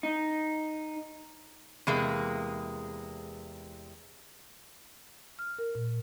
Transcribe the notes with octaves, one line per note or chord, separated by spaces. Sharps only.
D#4
E2 C3 G#3 A#3
F6
A#4
A#2